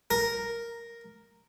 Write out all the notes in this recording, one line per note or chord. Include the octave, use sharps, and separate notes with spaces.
A#4